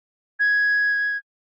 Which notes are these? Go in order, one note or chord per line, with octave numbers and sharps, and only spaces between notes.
G#6